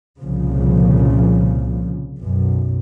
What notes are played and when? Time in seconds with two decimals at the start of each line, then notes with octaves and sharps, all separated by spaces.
0.20 C2 A#2 C#3 F3
2.21 B1 F#2